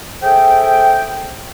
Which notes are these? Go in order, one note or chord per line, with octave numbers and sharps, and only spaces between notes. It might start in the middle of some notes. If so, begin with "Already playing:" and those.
G#4 A4 C5 E5 G5